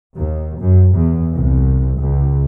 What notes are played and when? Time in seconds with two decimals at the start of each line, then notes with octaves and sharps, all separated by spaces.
0.16 D#2
0.60 F#2
0.94 E2
1.34 C2
1.99 C#2